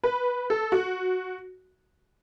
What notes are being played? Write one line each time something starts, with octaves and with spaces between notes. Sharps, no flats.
B4
A4
F#4